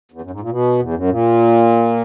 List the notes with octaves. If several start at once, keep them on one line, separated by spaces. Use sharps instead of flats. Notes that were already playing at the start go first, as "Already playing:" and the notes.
E2
F#2
G#2
A#2
B2
E2
F#2
A#2